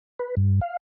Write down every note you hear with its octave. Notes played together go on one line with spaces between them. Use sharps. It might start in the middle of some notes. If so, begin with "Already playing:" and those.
B4
G2
F5